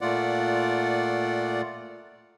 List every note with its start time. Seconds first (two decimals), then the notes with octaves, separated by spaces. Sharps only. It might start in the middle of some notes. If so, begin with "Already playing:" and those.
0.01 A#2 A3 F4 D5 F#5